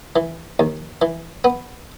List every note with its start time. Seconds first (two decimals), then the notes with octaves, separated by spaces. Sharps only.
0.16 E3
0.59 D#2
1.02 E3
1.44 B3